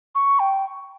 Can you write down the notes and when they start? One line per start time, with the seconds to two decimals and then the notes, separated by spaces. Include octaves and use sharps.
0.15 C#6
0.39 G5